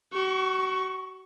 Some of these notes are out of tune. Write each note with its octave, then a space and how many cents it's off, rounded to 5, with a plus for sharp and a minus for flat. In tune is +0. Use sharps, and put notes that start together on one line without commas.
F#4 +35 C#6 +0